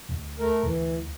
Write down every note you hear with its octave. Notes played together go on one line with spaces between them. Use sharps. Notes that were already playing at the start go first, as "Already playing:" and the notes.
D2
A3 A#4
D2 E3